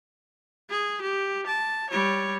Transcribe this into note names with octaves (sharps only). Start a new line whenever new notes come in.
G#4
G4
A5
G3 C#5